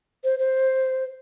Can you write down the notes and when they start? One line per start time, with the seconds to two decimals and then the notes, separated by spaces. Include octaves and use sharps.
0.24 C5
0.39 C5